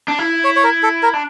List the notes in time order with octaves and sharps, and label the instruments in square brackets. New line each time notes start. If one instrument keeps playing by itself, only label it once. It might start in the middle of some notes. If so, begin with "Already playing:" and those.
[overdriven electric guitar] D4
E4
[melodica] C#5
C#5
A#4
A4
A#4
[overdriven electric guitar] D4